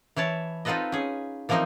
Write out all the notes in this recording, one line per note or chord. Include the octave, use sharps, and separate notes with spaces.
E3 E4 C#5 A5
C4 D#4 F4 A4 B4 D#5
C#4 G#4
E3 F3 A#3 C4 D#4 C5